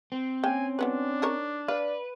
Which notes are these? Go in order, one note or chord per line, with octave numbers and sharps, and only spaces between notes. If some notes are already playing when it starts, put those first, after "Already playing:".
C4
A#3 C#4 G5 G#5
F#3 B3 D4 B4
D#4 A#4 C#5
B4 D5 F5